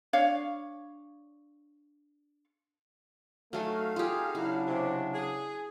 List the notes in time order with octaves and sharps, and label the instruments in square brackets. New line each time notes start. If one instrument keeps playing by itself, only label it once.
[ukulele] D4 C#5 F5
[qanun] F#3 A4 G#5 [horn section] A3 [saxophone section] D#4 F#4 F5
[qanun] F4 G4 [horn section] G#4
[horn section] C#3 F#3 D4 [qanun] E4
[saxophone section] C3
G#4